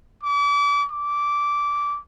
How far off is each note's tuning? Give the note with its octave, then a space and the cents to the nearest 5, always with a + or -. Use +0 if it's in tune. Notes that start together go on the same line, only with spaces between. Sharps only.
D6 -35
D6 -15